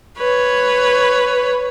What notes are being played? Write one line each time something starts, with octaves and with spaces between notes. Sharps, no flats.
B4 C#5